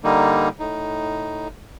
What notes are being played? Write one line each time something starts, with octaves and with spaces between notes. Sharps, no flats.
D3 G3 A#3 D#4
A2 D#4